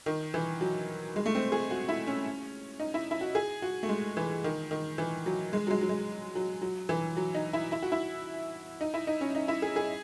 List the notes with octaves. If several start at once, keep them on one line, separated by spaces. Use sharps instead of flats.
D#3
E3
F#3
G#3
A3
C4
G#4
F#4
E4
C#4
D#4
E4
E4
F#4
G#4
F#4
A3
G#3
E3
D#3
D#3
E3
F#3
G#3
F#3
G#3
F#3
G#3
F#3
F#3
E3
F#3
D#4
E4
E4
F#4
E4
D#4
E4
D#4
C#4
D#4
E4
G#4
G#4